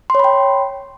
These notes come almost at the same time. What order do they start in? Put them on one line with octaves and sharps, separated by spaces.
C6 C#5 B5 G5